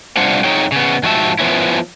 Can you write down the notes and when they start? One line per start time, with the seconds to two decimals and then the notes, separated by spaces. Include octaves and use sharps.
0.17 C3 G3 D4 F4 C5 F#5
0.44 F2 F#3 D#4 G#4 C#5 G5
0.72 C#3 B3
1.03 G#2 F3 F#4 G4 E5 A5
1.39 F3 B3 C#4 E4